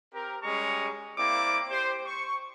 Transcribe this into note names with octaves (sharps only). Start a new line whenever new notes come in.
C4 G4 A#4
G3 G#3 C#4 A#5 C#6
A#3 C4 E4 D5 D6
G4 C5
C#6